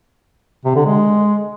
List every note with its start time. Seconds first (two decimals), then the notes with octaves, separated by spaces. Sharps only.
0.65 C3
0.75 D3
0.86 G#3